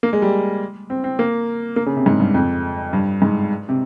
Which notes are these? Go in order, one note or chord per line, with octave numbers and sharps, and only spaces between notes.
A#3
G#3
G3
C4
C4
A#3
A#3
C#3
C3
G#2
G2
F2
G2
G#2
C3